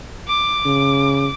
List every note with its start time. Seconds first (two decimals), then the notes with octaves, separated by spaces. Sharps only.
0.27 D6
0.65 C#3